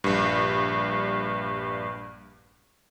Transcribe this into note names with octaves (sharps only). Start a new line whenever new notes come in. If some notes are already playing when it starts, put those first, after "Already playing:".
A#1 G2